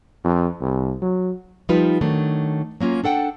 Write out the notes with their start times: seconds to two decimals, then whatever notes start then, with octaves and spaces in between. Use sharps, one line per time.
0.24 F2
0.61 C2
1.02 F#3
1.69 F3 G3 D#4 F4 B4
2.01 D#3 F#3 A3 D4
2.80 F#3 A#3 C#4 F4
3.04 D4 A4 F#5 G5